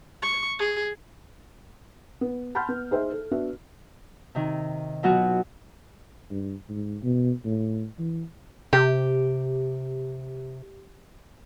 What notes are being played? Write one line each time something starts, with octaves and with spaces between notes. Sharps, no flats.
C#6
G#4
B3
F#5 A5 B5 C6 F6 G6
B3
D#4 G#4 C5 E5
A4
B3 D4 F#4 E5
C3 D#3
B2 F#3 F4 F#4
G2
G#2
B2
A2
E3
C3 G4